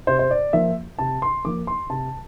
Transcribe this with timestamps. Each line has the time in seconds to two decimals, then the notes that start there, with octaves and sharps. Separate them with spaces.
0.07 C3 C5
0.19 C5
0.31 D5
0.53 F3 A#3 E5
0.99 C3 A5
1.22 C6
1.45 F3 A#3 D6
1.67 C6
1.89 C3 A5